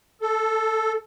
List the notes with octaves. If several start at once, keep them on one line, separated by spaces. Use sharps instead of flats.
A4